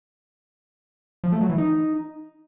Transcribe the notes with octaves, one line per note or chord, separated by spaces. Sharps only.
F3
A3
F#3
E3
D#4